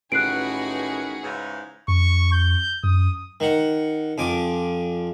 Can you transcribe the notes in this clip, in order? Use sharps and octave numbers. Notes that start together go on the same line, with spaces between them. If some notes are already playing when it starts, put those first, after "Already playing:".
A1 D#3 F#4 G#4 B4 F#6 C7 D7
G#2 C#3 E3
F2 C#6
G6
F#2 D#6
D#3 F#5
F2 G#5 D6